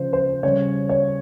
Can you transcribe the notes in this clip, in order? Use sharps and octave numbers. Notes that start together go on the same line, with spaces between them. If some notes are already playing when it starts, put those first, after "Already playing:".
Already playing: C#3 F3 C5
C5
C#3 G3 C#5
C#5